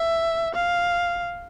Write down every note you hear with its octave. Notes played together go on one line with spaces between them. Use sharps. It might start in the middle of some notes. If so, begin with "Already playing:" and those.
Already playing: E5
F5